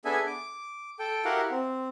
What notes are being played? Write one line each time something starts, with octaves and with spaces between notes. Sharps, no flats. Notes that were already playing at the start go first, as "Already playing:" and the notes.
B3 D4 G#4 A4 E5 G#5
D6
A4 G5
E4 F#4 G4 A#4 F5 F#5
C4